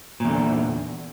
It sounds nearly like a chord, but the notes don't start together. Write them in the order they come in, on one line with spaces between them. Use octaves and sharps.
A#2 E2 D3